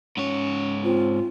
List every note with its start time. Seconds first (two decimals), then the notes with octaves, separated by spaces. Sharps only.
0.17 G#2 C#4 C#5
0.84 C4 F4